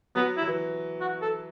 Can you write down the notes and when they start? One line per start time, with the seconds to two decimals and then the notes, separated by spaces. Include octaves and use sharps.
0.15 F#3 B3
0.37 E4
0.42 F#3
0.48 E3
1.00 F#4
1.22 A4